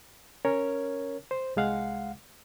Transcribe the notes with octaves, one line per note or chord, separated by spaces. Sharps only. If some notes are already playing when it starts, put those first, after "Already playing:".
C#4 A#4 C#5
C5
C2 G#3 F5 F#5